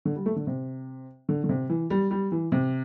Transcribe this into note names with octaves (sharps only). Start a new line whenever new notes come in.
D3
G3
A3
D3
C3
D3
D3
C3
E3
G3
G3
E3
C3